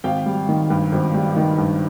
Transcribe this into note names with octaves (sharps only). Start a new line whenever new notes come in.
G#1 F5 G5
G3
D#3
G2
G#1
G3
D#3
G2